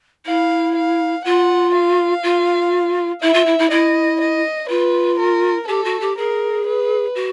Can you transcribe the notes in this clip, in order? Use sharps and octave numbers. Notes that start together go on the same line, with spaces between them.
E4 F5
F5
F4 F#5
F5
F4
E4 E5
F4
E4
E4
E4 D#5
D#5
F4 B4
A#4
G4 A4
F#4
G4
G#4 A#4
B4
F#4